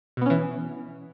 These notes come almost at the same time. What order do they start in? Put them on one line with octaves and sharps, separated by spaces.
B2 B3 C#4 E3